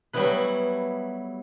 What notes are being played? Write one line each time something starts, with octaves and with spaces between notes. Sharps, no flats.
F#3 G3 A3 B3 E4 B4